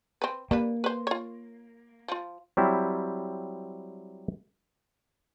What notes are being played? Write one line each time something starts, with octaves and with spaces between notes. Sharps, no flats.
C4 B4
G3 A#3 D4 B4
B4 C5
F4 C#5
F3 F4
F#3 G3 C4 E4